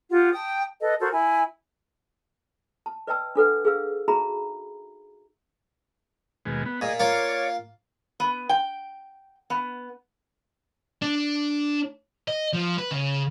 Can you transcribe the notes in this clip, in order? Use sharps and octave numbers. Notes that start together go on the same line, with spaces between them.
F4 G4 F#5
G5 A5 D#6
A4 B4 D#5
F#4 A4 A#4 C5
E4 G#5
A5
B4 D5 D#5 G5 A5 E6
D4 A4 B4 F#5
G#4 B4 F5 E6
D#4 F#4 G#4 E5 A#5 B5
D#2 B2 G#3
B3
A#2 G#4 D#5
A#3 F4 C#5 D5
B3
G5
B3
D4
D#5
F3
B4
C#3